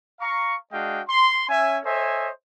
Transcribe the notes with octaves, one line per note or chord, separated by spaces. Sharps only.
F5 A#5 C#6
G#3 D4 F#4 D#5 F5 G5
C6
C#4 E5 G#5
A4 C5 C#5 D#5 E5 G#5